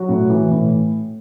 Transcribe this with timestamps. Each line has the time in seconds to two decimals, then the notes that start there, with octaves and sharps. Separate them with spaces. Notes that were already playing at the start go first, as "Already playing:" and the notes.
Already playing: F#3 F#4
0.09 A2
0.30 E3
0.51 A2